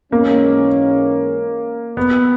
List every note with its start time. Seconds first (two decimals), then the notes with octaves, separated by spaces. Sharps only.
0.12 G#2 E3 G#3 A#3 C#4
1.97 B3